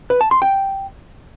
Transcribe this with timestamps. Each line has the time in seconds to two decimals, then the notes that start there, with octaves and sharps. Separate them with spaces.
0.10 B4
0.21 A5
0.31 C6
0.42 G5